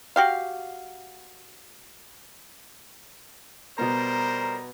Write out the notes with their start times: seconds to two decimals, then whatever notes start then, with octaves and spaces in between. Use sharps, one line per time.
0.16 F#4 G4 F5
3.78 B2 G3 B3 A#4 C5 A#5